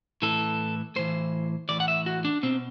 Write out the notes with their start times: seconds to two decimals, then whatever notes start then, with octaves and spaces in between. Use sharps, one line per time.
0.22 A2 E3 A4
0.96 A2 E3 C5
1.69 A2 E3 D5
1.80 F#5
1.88 E5
2.06 F#4
2.25 D4
2.43 B2 C4